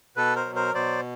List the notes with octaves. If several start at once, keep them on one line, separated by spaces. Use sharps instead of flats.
B2 A4 B4
A#4 C5
F#3
A#4 C5
B2 C5 D5